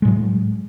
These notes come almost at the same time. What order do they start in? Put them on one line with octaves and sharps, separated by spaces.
G#3 A2 F#3